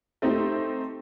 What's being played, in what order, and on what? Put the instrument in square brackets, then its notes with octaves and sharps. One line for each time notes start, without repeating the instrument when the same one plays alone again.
[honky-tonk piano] A3 C4 D#4 G4